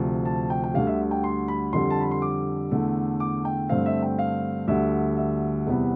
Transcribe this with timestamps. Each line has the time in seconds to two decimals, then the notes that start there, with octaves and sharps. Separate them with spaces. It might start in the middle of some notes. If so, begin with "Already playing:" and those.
Already playing: D2 C3 F3
0.25 A5
0.50 G5
0.64 G5
0.74 D2 D3 G3 F5
0.87 E5
1.11 G5
1.24 C6
1.48 B5
1.73 F2 D3 G3 C6
1.90 A5
2.00 B5
2.11 C6
2.22 D6
2.71 E2 D3 A3
3.20 D6
3.45 G5
3.69 G2 D3 A3 C4 F5
3.86 E5
4.02 G5
4.19 F5
4.68 D2 D3 G3 E5
5.17 E5
5.67 E2 C3 G3 B3